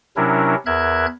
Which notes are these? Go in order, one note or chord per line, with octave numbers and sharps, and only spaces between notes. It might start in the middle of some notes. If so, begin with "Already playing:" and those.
C3 F#3 C#4 D4 E4 A#4
E2 A#4 E5 F#6 G#6